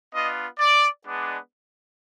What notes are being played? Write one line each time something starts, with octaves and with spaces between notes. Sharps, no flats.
B3 D4 F4 D#5
D5
G#3 B3 D4